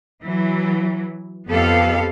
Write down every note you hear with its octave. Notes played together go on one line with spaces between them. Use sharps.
E3 F#3
F2 B3 G4 A4 F5